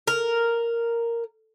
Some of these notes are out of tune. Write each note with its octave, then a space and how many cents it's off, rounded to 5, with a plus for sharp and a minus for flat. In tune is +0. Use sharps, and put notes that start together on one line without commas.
A#4 -5